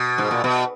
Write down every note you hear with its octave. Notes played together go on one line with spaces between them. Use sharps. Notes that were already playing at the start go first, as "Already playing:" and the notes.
Already playing: B2
G#2
A#2
B2